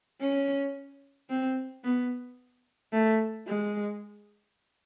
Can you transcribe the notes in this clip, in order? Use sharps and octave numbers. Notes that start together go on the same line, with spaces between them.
C#4
C4
B3
A3
G#3